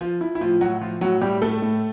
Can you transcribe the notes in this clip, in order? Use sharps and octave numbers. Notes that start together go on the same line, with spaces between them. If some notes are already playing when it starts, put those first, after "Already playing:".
F3 F4
F3 E4
E4
A2 F3 F4
A2 F#3 F#4
F3 F4
A2 F#3 F#4
A2 G3 G4
A2 A3 A4
A2